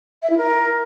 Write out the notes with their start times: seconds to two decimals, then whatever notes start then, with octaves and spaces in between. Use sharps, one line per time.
0.22 E5
0.30 E4
0.37 A#4